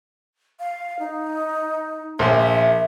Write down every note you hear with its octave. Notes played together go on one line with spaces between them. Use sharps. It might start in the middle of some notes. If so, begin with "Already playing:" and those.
F5
D#4
A#1 E5 C6